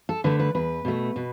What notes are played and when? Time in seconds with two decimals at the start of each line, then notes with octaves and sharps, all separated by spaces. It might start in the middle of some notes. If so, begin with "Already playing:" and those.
0.09 A4
0.24 D3 A3 B4
0.39 B4
0.55 E2 B4
0.85 B2 A3
1.16 B2